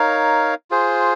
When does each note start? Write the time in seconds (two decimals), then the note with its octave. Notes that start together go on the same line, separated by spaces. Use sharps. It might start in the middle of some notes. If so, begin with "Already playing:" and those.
Already playing: D#4 A#4 C#5 F5
0.71 F4 G#4 C5